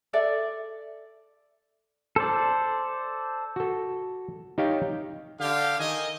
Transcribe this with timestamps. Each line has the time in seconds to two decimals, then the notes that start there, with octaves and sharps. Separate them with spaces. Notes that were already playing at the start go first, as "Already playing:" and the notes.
0.13 A4 D5 E5
2.16 A4 C5 D5
3.56 F#4 A4
4.58 D#4 G4 C#5 F5 G5
5.40 D3 G4 F5
5.79 D#3 D#5 G#5